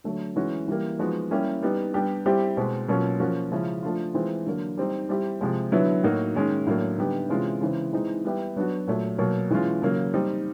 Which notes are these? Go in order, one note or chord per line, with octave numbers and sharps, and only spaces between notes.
D3 F#3 A3
E3 G#3 C#4 F#4
E3 G3 A#3
F3 G#3 B3 D#4 F#4
G3 A#3 C#4 E4 G4
G3 B3 D#4
G3 B3 D4 G4
G3 C4 E4 G4
B2 G#3 C4
B2 F#3 A#3 C#4 F4
F3 A#3 C#4 F#4
C#3 F3 G#3 C#4 E4
F3 A3 D4 F4
E3 G#3 C4 F4
D3 F#3 A#3
G3 C4 D#4
G3 C4 E4 G4
C3 F3 G#3
D3 F#3 B3 E4
A2 F#3 A#3 D#4 F#4
D#3 G#3 C#4
A2 F#3 A#3 D4
D3 G3 B3 D#4 G4
C3 E3 G#3 C#4 F4
C#3 E3 G#3 C4
E3 G#3 C4 D#4
G3 B3 E4 G4
F#3 B3 D4 F#4
A#2 F#3 A3
B2 F#3 A#3
E3 G#3 C#4 F4
C#3 F#3 A#3
G3 C4 D#4